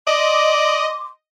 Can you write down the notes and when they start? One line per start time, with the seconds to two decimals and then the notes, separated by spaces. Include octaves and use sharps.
0.07 D5 D#5 C6 D6